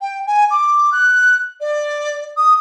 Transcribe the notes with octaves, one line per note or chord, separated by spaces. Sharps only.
G5
G#5
D6
F#6
D5
D#6